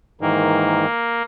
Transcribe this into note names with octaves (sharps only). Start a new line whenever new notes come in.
G#2 D#3 E3 A#3